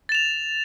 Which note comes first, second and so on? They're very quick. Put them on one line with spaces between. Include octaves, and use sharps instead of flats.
A6 E7 F7